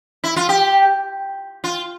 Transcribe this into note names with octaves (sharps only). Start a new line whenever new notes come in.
E4
F4
G4
F4